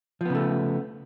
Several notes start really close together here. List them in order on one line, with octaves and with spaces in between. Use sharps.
F3 B3 C#3 A3